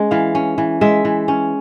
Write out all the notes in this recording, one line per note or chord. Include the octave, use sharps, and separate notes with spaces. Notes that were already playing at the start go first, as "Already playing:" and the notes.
Already playing: G#3 C#4
E3 F5
C#4
E3
G#3 E5
E3
C#4